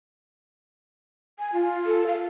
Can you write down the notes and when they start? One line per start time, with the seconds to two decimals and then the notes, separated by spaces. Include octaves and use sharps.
1.39 G#5
1.53 F4
1.86 A4
2.06 F5